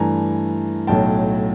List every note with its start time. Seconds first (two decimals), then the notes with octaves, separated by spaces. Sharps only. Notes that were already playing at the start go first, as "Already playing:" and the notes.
Already playing: G2 E3 A3 G#5 A#5
0.87 B1 A2 F#3 G5 A5